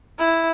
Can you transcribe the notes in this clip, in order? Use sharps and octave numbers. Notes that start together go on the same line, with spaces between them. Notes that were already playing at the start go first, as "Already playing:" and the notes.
E4